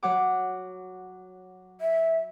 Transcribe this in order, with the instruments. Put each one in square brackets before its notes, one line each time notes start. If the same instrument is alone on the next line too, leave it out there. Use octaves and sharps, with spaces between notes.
[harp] F#3 F#5 D6
[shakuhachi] E5